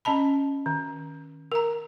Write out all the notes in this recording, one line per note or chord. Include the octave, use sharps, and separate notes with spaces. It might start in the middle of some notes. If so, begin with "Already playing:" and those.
C#4 D#5 A5 B5
D#3
A#4 A#5